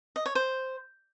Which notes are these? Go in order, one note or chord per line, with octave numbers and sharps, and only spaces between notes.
D#5
C#5
C5